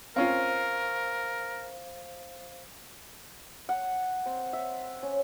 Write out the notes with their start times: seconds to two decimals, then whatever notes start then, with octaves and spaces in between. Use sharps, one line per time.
0.16 C4 C#4 F4 A#4 C5 F5
3.69 F#5
4.26 C4
4.53 E5
5.03 C#4